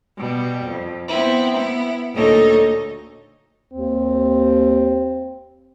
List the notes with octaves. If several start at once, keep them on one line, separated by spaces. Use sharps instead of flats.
B2 G3
F2
B3 C4 E4
B3 E4
D2 A#2 D#4 A4 C#5 D#5
D#2 C4